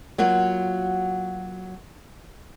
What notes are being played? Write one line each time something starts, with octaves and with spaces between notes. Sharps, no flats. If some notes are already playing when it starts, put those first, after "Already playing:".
F#3 A#3 F4 F#4